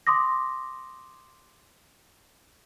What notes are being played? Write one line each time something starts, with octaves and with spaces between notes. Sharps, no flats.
C6 D6 D#6 A#6